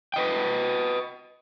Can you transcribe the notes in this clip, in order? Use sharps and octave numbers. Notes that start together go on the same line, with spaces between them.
B4 D#5 G5